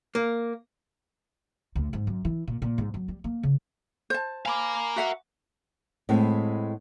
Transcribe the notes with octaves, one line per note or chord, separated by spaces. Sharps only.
A#3
D2
G#2
F#2
E3
A#2
A#2
G#2
F#2
G3
A#3
C#3
C5 A5
A#4 F5 G#5 B5 D6
F#4 E5 F#5
A2 G#3 B3 C4